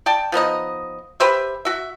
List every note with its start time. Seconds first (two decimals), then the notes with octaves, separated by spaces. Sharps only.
0.06 D5 G5 A5
0.32 F3 B3 D#4 D#5
1.20 G4 B4 C5 E5
1.65 F#4 E5